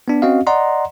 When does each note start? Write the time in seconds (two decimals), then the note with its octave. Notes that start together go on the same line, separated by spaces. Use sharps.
0.08 B3 D4
0.22 C4 C#4 F#4 D#5 F5
0.47 D5 D#5 F#5 A#5 C6